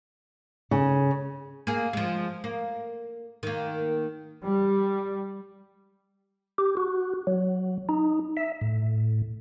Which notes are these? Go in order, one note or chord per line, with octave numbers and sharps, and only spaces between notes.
C#3
A#3 G#4
F3 G#3
A#3
D#3 A#3
G3
G4
F#4
F#3
D#4
E5
A2